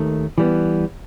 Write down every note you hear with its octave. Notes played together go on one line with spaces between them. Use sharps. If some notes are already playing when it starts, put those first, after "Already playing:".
Already playing: D#2 D#3 A3
E3 G3 B3